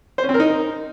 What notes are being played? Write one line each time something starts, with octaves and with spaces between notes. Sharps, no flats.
C5
C#4
C4
A#4
D#4